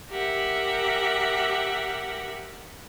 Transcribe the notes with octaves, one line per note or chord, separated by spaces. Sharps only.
G4 A#4 E5 F#5